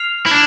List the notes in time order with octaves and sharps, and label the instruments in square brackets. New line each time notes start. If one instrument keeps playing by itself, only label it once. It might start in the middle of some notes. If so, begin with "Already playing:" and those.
Already playing: [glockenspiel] F6 C7 F7
[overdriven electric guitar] E4
D4